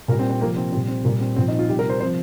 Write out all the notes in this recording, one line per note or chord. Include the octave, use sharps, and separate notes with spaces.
A#2 G3 A#4
C4
C4
C3 F3 A#3
C4
A#2 G3 C4
C4
A#2 G3 A#3
C4
A#2 F3 C4
D#4
F4
C3 G3 G4
A#4
C5
C3 F3 C5